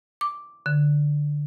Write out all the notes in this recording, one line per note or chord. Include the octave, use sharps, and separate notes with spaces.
D6
D3